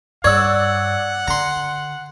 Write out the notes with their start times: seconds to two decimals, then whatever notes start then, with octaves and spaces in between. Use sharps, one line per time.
0.24 G2 C#5 D5 F#5 E6
1.28 D3 A#5 C6